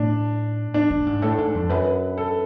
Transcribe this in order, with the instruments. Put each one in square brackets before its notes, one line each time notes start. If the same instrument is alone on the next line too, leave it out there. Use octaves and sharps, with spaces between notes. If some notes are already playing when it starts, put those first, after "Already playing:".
Already playing: [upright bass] A2 [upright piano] D4
[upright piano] D4
[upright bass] A2
G#2
[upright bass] A2 [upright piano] A4
[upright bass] G#2
F2
[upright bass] F#2 [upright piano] B4
[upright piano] A4